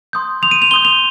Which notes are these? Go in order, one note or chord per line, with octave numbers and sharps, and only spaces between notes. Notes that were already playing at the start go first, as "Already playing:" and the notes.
C6 D#6 G6
C6 D#6 G6 F7
D#7
F7
C6 D#6 G6 G7
F7